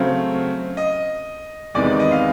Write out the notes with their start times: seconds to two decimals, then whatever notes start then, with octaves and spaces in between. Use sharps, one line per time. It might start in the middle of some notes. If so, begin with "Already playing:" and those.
Already playing: C#3 F#3 A3 C4 F5
0.77 D#5
1.74 E2 C3 D#3 G#3 B3 D5
1.87 D5
2.00 D#5
2.12 F5